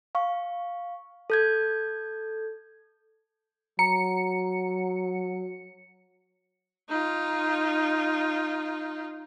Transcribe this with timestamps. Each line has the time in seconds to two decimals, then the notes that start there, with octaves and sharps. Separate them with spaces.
0.15 F5 C#6
1.30 A4 G6 G#6
3.79 F#3 A#5 C#7
6.88 D#4 F4